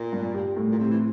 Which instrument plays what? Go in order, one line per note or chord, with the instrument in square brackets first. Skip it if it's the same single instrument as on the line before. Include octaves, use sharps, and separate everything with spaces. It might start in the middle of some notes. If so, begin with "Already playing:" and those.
Already playing: [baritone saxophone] A#2
[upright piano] G2
G4
A2
[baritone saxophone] A#2
[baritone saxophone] C3 [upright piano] C4
[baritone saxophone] E3